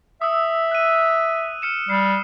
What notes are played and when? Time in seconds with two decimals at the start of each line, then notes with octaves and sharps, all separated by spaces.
0.22 E5 D#6 E6
0.71 F#6 D#7
1.62 F6 C#7 E7
1.89 G3 F6 C7